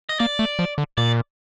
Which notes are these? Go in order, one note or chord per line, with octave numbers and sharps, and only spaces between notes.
D#5
A#3 D5
A3
F3
D3
A#2 D5